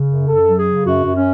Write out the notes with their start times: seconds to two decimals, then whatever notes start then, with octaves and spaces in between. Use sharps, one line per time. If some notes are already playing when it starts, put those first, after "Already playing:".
Already playing: C#3
0.09 F#2
0.28 F#2 A4
0.47 F#3
0.57 G#4
0.66 C#3
0.85 F#2 F#4
1.05 F#2
1.14 C#4